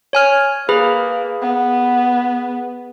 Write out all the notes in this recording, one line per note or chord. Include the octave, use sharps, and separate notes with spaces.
C#5 G#5 F6
A#3 G#4 B4 B5
B3